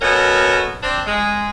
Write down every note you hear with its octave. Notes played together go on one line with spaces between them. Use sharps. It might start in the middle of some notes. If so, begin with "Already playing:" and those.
B2 C#4 F#4 A4 A#4
C4 D4
G#3